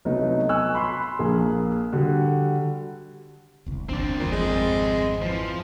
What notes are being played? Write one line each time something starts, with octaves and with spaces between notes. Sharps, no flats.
C2 F#3 A3 B3 D#4
G#5 C#6 E6 F#6
B5 C6 F#6
A#1 A#3 G#4
D3 G3 F#4
E1 C2
G1 D2 C4 D4 D5
F#1 E2 A#2
G#1 F2 G#3
E3 F3